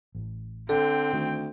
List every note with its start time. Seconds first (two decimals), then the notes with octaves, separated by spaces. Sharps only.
0.15 A1 A2
0.69 D3 C4 A4 G5
1.13 D2 D#3